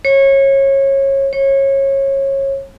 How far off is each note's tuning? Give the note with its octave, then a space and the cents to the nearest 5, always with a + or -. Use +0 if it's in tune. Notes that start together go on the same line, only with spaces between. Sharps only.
C#5 -25
C#5 -25